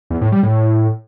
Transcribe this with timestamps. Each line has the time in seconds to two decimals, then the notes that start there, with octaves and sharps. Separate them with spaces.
0.10 E2
0.21 A2
0.32 G3
0.43 A2